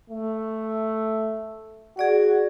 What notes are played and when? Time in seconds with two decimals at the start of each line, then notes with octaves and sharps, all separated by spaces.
0.10 A3
1.97 F#4 G#4 D5 F#5